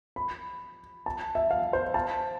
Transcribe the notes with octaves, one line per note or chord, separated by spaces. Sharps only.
B5
A5
E5
F5
C5
A5